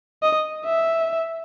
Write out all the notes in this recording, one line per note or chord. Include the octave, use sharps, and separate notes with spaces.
D#5
E5